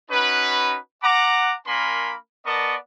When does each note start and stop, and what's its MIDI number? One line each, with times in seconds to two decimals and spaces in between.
0.11 0.78 61
0.11 0.78 63
0.11 0.78 66
0.11 0.78 71
1.03 1.55 78
1.03 1.55 82
1.03 1.55 86
1.67 2.15 58
1.67 2.15 62
1.67 2.15 70
1.67 2.15 80
1.67 2.15 83
1.67 2.15 84
2.46 2.76 59
2.46 2.76 70
2.46 2.76 74
2.46 2.76 75
2.46 2.76 81
2.46 2.76 85